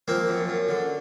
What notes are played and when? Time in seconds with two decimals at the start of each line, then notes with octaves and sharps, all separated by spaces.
0.08 F3 A#3 C4
0.28 F#2
0.48 F#2
0.69 D3